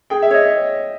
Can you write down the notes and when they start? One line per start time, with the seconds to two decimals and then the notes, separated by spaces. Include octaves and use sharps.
0.10 G#4 G5
0.22 E5
0.31 C#5 D#5